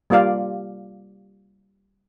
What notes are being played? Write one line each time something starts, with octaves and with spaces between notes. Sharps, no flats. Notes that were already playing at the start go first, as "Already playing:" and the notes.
G3 A#3 F4 D5 F5